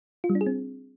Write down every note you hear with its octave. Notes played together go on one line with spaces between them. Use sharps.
F4
G3
D4
G#4
C4